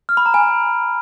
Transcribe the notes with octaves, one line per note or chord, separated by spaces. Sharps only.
F6
B5
A#5
G#5